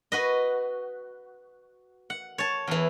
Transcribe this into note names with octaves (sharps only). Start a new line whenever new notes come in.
F#4 B4 D#5
F#5
C#5 A5
E2 E3